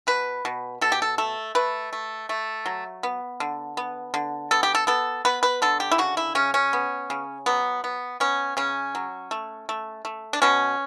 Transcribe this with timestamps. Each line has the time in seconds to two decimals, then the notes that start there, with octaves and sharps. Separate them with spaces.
0.07 B2 B4
0.45 B2
0.81 B2 A4
0.92 G4
1.02 A4
1.18 A3 A4
1.55 A3 B4
1.93 A3
2.29 A3
2.66 F#3
3.03 B3
3.40 D3
3.77 B3
4.14 D3
4.51 B3 A4
4.63 G4
4.75 A4
4.87 B3 A4
5.25 B3 B4
5.43 B4
5.62 D3 A4
5.80 G4
5.92 E4
5.98 C#3 F#4
6.17 E4
6.35 C#3 C#4
6.54 C#4
6.73 B3
7.10 C#3
7.46 F#3 B3
7.84 B3
8.20 B3 C#4
8.57 C#3 C#4
8.95 F#3
9.31 A3
9.69 A3
10.05 A3
10.33 D4
10.42 B2 C#4